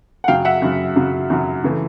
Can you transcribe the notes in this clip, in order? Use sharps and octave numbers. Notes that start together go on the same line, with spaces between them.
F#5
F#2 C#3 F#3 F5 G5
E5 F#5
F#2 C#3 F#3
F#2 C#3 F#3
F#2 C#3 F#3
C#3 E3 A3